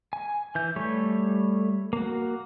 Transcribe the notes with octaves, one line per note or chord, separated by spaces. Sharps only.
G#5
E3 G6
G3 A3 C#5
A#3 F#4